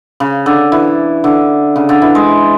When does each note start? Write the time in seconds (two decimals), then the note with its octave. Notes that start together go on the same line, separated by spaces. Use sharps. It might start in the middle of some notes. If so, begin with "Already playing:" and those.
0.20 C#3
0.46 D3
0.72 E3
1.24 D3
1.76 C#3
1.89 D3
2.02 E3
2.15 G#3